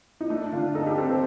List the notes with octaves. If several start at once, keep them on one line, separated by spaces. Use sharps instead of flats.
D#4
A3 D4
D3 F4
D#4 A4
G4
C4 A4
C5